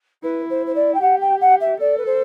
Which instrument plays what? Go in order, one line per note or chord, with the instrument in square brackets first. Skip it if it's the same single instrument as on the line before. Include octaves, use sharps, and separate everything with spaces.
[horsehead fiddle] E4 [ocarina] B4
[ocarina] C5
C5
D5
G5
[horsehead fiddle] G4 [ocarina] F#5
[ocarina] G5
F#5
E5
[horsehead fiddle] A4 [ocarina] D5
[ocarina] B4
C5